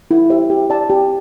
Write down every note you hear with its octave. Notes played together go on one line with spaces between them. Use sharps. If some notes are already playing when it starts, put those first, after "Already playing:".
E4
G4 C5 E5
G4
D5 A5
G4